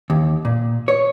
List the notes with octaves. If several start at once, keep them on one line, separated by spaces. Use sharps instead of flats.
D#2
A#2
C#5